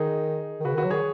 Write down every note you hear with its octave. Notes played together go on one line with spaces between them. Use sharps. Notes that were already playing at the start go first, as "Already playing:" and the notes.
Already playing: D#3 D#4 G#4
D#3
C#3 F#4 B4
D#3
F#4 B4
F#3
D#3 G#4 C#5